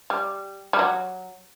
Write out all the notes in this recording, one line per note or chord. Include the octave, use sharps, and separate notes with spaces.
G3
G3
F#3